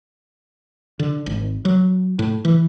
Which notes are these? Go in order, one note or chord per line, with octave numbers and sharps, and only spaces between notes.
D3
G#1
F#3
A2
E3